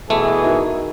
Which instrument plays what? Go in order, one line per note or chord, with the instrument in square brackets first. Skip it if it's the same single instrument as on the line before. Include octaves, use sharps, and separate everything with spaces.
[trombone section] B2 E3 G#4 [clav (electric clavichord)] A3
[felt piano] D#4 F#4 A#4